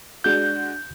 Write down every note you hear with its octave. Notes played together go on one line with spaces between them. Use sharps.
G#3 D4 F#4 G6